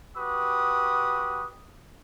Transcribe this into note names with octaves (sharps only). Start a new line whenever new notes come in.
F#4 G4 B4 D6 D#6